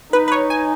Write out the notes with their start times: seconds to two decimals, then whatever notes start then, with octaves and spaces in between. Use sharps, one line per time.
0.13 D#4 B4
0.28 B4
0.32 C#5
0.50 G#5